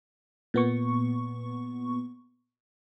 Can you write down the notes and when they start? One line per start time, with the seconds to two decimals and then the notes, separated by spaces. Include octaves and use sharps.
0.54 A#2 B3 C#6